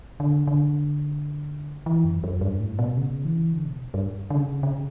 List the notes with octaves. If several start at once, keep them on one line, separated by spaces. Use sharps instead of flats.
D3
D3
E3
F#2
F#2
G2
A2
B2
C#3
E3
D3
B2
G2
D3
C#3
C#3